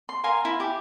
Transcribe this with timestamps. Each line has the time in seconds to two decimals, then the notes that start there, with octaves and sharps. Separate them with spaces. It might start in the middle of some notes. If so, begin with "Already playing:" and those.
0.09 C6
0.24 A#4 F5 G#5 C6
0.45 E4
0.60 G4